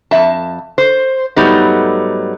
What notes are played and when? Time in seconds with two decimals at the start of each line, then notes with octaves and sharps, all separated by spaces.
0.11 F2 G3 E5 A5
0.78 C5
1.36 G#2 F#3 G3 A3 B3 D#4